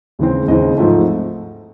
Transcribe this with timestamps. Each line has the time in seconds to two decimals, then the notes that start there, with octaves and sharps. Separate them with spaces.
0.19 D#2 C#3 E3 G#3 C4
0.48 D#2 C#3 E3 G#3 C4 D#5
0.77 G#2 F3 A3 C4